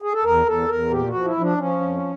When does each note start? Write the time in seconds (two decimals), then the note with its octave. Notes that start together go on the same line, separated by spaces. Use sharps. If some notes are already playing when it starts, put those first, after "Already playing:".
0.02 G#4
0.13 A4
0.24 E2 A#4
0.46 E2 A4
0.69 E2 A#4
0.91 A#2 G4
1.08 F#4
1.14 F3
1.25 E4
1.36 F3
1.41 D4
1.58 F3 C#4
1.81 F2